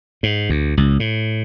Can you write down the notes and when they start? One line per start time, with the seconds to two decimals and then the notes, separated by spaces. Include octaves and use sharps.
0.23 G#2
0.49 D2
0.77 C#2
1.00 A2